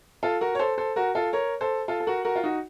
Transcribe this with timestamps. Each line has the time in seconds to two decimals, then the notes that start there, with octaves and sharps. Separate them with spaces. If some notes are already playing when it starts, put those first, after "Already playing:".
0.23 F4 A4
0.41 F#4 A#4
0.55 C#5
0.59 A4 C5
0.78 A4 C5
0.96 F#4 A#4
1.15 F4 A4
1.33 A#4 C#5
1.61 A4 C5
1.88 F4 A4
2.00 A4
2.07 F#4 A#4
2.25 F#4 A#4
2.36 F4
2.43 D#4 F#4